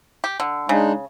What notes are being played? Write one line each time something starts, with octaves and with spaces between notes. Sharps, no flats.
G4
D3
C#3 G#3 D4 D#4